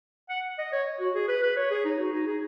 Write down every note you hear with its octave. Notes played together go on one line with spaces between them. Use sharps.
F#5
D#5
C#5
F#4
G#4
B4
B4
C#5
G#4
D#4
F#4
D#4
G#4